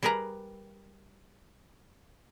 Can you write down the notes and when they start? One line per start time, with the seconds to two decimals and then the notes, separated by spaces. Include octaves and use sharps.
0.03 G3 G#4 A#4 B4 A#5